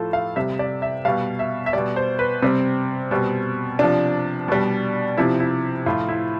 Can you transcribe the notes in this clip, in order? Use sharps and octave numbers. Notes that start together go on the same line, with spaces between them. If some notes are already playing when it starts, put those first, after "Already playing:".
Already playing: A2 F3 F4 A4
F5
C3 G3 E5
D5
E5
B2 G3 F5
E5
E5
B2 G3 D5
C5
B4
C3 G3 C4
B2 G3
C3 F3 D4
B2 G3
C3 F3 E4
E4
A2 F3 F4
E4